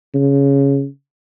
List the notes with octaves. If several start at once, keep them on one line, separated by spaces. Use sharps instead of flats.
C#3